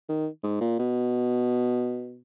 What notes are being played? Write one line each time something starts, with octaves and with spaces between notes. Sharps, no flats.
D#3
G#2
A#2
B2